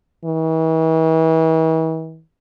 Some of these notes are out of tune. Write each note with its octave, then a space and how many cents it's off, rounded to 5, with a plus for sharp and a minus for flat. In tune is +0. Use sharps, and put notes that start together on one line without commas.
E3 -40